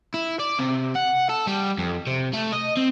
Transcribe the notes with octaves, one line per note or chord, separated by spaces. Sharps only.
E4
D5
C3
F#5
A4
G3
F2
C3
A3
D#5
C4